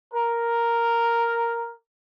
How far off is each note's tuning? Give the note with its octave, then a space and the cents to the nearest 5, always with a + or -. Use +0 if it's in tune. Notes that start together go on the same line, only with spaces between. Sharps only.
A#4 +0